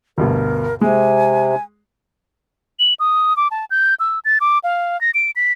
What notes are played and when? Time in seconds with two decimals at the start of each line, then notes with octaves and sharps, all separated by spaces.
0.18 D2 G2 B2 A#4
0.81 C3 G#3 G#5
2.79 F#7
3.00 D#6
3.37 D6
3.51 A5
3.71 G6
4.00 E6
4.25 A6
4.41 D6
4.64 F5
5.01 A#6
5.14 D7
5.36 B6